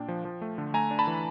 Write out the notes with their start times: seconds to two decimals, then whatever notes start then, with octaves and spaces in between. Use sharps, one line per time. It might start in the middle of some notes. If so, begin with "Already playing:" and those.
Already playing: A#2 A#3 D4 G5
0.08 F3
0.25 F3
0.42 A3
0.58 D3
0.74 A3 G#5 A#5
0.91 D4
0.99 A5 B5
1.07 E3